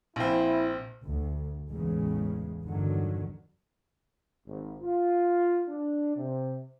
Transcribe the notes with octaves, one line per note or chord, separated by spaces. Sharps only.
A#1 C4 E4
D2
A1 E2 A2 C#3 G#3
G1 E2 D3 D#3 F#3
G#1
F4
D4
C3